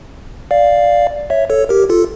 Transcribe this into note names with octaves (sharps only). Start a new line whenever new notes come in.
D5 F5
C#5 E5
A4 C#5
G4 A#4
F4 A4